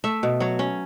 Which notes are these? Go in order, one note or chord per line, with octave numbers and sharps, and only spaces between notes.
A3 E5
B2
F#3 C#5
C#4